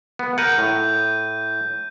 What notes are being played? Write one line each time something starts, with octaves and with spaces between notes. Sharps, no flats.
B3
A#4 F#5 G6 D#7
A2